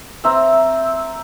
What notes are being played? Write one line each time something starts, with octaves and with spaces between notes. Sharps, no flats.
C4 E5 A#5